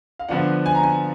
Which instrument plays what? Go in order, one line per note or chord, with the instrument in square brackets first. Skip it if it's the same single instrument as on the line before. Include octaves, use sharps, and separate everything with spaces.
[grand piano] F5
D3 F3 B3 D4 F#5
G#5
A#5
G#5